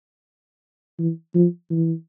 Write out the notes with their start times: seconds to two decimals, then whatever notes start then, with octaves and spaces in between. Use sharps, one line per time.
0.99 E3
1.35 F3
1.71 E3